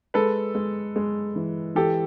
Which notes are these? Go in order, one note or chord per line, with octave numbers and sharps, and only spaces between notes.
G#3 A4 B4
G#3
G#3
E3
E3 G4 A4